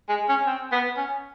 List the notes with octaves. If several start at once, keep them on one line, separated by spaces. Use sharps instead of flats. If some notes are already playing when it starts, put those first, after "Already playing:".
G#3
C#4
C4
B3
C#4